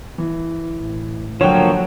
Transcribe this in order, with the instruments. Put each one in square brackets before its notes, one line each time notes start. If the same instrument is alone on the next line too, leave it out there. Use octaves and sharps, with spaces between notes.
[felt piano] E3
[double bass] A1
[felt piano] D3 [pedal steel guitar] F3 A#3 F#4 [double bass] F#3 [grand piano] C#5 G5